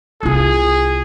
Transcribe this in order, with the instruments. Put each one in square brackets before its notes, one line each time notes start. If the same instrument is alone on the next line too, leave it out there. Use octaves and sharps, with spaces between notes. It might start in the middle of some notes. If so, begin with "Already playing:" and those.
[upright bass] C2 F4 [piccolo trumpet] G#4